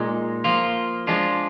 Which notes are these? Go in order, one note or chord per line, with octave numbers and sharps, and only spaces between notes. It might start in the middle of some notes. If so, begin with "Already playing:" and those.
Already playing: A#2 G#3 D#4
F3 A#3 F4
F3 G#3 D4 F4